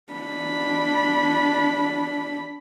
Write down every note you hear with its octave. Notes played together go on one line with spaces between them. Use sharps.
D4 B5